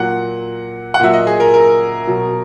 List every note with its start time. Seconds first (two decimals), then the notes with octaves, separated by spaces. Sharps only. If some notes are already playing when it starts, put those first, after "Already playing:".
Already playing: A#2 F#3 F#5
0.94 F#5
1.00 A#2 F#3 E5
1.13 D#5
1.27 G#4
1.40 A#4
1.54 A#4
2.07 B2 F#3